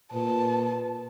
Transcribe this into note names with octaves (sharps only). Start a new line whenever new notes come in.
A#2 B4 A5